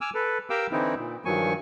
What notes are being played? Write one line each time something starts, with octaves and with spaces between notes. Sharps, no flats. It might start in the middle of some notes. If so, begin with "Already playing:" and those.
G#5 D6 E6 F6
A4 B4
G4 A#4 F5 G5 D6 E6
D3 E3 C4 D#4 E4
A#2
G2 D#3 F3 F#3 G#5 C#6